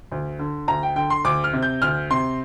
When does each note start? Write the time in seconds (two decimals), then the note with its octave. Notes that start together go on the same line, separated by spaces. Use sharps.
0.12 D2
0.39 D3
0.68 D2 A#5
0.83 G5
0.96 D3 G5
1.10 C6
1.24 D2 D6
1.44 F6
1.53 C3
1.62 G6
1.82 D2 F6
2.11 C3 C6